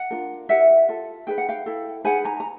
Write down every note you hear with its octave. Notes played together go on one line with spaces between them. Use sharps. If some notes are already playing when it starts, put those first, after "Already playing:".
Already playing: F#5
D4 F4 A#4
E4 G4 A#4 E5 F#5
F4 A4
D#4 G#4 B4 G5
F#5
F5 G5
E4 A4
D#4 G#4 B4 F#5 G#5
G#5 A#5
A#5